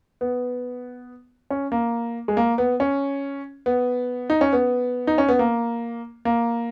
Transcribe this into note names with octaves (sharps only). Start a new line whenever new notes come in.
B3
C#4
A#3
G#3
A#3
B3
C#4
B3
D#4
C#4
B3
D#4
C#4
B3
A#3
A#3